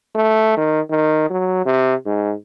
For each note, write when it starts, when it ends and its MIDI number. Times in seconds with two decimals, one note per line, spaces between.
0.15 0.55 57
0.57 0.80 51
0.91 1.26 51
1.30 1.62 54
1.66 1.95 48
2.06 2.34 44